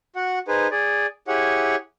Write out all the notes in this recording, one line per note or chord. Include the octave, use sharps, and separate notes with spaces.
F#4 F#5
D#4 G#4 B4 C5
G#4 D5
E4 G4 G#4 C#5 F#5